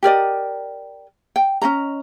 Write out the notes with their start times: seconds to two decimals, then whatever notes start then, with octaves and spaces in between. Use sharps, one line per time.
0.03 G4 A#4 D5 D#5
1.36 G5
1.62 C#4 D#4 D#5 A#5